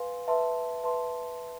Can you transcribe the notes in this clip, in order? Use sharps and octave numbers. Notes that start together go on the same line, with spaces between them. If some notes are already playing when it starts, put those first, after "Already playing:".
Already playing: B4 F5 G#5 C6
B4 E5 A5 C6
B4 E5 A5 C6